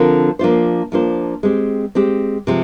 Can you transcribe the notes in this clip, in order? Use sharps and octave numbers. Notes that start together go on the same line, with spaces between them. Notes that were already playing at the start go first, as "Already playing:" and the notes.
Already playing: D3 F3 C4 F4 A#4
F3 A#3 D4 F4 C5
F3 A#3 D4 F4 C5
G#3 C4 G4
G#3 C4 G4
C3 F3 G#3